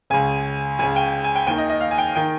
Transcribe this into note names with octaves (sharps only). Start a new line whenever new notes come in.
C#2 C#3 G#5
C#2 C#3 G#5
G5
G#5
G5
D#2 D#3 G5
D#5
D#5
F5
G#5
G5
D#3 G5